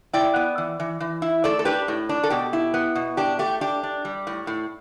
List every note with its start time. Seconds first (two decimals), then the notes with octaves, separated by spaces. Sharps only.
0.13 E4 D5 G5
0.36 B3
0.58 E3
0.80 E3
1.00 E3
1.22 E4
1.44 A3 A4 D5
1.59 A4
1.65 D4 G4 B4
1.88 A2
2.09 D4
2.23 A4
2.30 B2 G4
2.53 E4
2.74 B3
2.95 B2
3.17 D4 G4
3.39 A3 G4
3.61 D4 G4
3.83 D4
4.05 G3
4.27 A2
4.47 A2